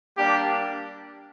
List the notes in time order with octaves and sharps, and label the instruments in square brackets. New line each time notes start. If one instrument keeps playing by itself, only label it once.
[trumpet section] G3 A#3 D4 [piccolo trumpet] G4